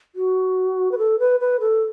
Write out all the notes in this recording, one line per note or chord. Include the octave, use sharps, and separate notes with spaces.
F#4
B4
A4
B4
B4
A4